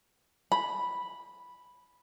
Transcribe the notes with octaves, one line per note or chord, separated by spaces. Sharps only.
B5